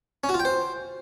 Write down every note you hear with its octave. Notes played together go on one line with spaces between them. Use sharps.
C#4
F#4
F4
G5
C5